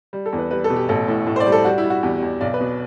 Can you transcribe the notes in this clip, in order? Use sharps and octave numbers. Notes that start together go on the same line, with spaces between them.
G3
A4
E2
B4
G3 B4
A4
B2
G4
A1 A4
A2
A2
C5
D5
G3
A4
G3 F#4
E4
G3
F#4
E2 G4
G4
E2
B1 D5
B4
B2